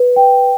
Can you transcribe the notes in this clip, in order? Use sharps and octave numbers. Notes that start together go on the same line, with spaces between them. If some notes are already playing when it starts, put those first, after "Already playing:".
Already playing: B4
G5